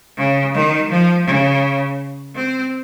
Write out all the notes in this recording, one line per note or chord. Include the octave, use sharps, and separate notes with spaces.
C#3
D#3
F3
C#3
C4